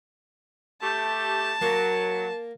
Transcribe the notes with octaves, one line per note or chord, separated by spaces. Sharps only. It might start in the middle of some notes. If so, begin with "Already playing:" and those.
A3 G4 A5
F#3 A#3